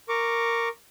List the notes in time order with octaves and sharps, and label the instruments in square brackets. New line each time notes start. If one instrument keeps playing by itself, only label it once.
[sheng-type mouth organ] A#4 C#6 D6